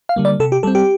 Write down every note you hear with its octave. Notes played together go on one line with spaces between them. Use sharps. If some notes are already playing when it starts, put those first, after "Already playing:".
F5
D3 G3 A#3
D5
C3 A4
G4
G3 C4 A4
G4